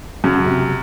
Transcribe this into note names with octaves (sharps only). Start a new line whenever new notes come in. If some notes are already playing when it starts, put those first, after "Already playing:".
F#2 C#3
C3